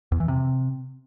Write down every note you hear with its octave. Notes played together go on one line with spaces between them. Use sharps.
E2
E3
C3